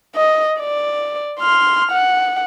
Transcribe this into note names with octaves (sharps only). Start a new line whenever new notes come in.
D#5
D5
C6 F6
F#5